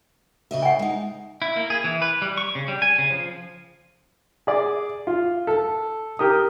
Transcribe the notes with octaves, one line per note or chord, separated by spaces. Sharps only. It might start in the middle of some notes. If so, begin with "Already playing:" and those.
C#3 D#5 E5
F#5 G#5
G#3 D#4
E4
A#3
G#4
E3
B4
G3
C#6
C#3
G3
G#5
C#3
F3
G#4 D5
F4
A4
G4 A#4 D#6